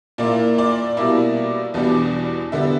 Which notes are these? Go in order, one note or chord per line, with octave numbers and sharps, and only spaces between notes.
A#2 A#3 E4 D5
D5
B2 G3 A#3 E4
E2 B2 G3 B3 D4
D3 G3 B3 E5